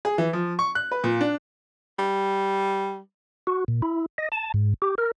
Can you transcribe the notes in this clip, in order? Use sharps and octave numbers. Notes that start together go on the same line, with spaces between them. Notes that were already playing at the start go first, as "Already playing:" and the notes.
G#4
E3
F3
C#6
F#6
B4
A#2
D4
G3
F#4
A#2
E4
D#5
A5
G#2
G4
A#4